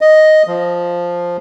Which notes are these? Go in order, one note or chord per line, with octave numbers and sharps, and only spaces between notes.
D#5
F3